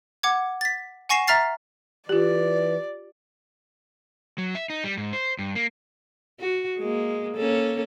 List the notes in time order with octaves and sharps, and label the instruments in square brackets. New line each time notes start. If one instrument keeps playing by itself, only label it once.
[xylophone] F#5 D6 G#6
A6 B6
F#5 G#5 C#6 A#6 C7 E7
E5 A#5 F6 A6 C7
[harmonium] E3 [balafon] F4 G4 [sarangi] D5
[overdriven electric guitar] F#3
E5
D#4
G3
G#2
C5
G2
A#3
[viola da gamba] F#4
G#3 A#3
A#3 C#4 A4